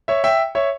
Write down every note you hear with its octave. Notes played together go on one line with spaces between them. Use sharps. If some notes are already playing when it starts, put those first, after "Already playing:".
C#5 E5
E5 G5
C#5 E5